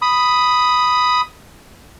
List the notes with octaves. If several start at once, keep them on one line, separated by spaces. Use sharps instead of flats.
B5 D#6